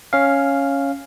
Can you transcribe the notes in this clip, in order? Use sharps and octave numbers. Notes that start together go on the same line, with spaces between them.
C#4 F5